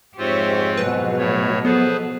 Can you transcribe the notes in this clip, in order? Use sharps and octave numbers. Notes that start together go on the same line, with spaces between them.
F2 G#2 C4 F4 G4 C5 C#5 E5
B2 F#3 B4
A2 A3 C#5
F3 B3 G#4 A4 B4 C5